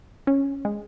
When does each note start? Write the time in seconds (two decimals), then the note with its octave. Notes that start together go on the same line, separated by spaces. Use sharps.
0.27 C#4
0.65 G#3